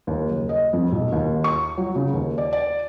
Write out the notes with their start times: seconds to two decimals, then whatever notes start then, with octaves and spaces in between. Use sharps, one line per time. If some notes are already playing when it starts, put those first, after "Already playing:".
0.07 D#2
0.29 F#1
0.49 D#5
0.73 F2
0.92 B1
1.12 D#2
1.44 C#6
1.78 F#3
1.95 C#3
2.13 D#2
2.38 D5
2.53 D5